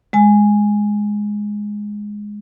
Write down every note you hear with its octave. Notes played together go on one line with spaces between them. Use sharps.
G#3 G#5